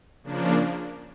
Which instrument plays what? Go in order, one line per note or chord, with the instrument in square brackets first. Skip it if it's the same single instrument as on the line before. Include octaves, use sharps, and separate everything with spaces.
[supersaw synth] C#3 F3 A#3 D4